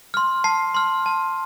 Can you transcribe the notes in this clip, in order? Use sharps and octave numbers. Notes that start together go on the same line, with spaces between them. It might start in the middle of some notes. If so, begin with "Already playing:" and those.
C6 F6
A5 C7
C6 F6
A5